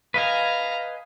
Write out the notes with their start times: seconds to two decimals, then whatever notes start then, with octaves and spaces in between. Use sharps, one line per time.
0.14 B4 D#5 F5 G#5 A#5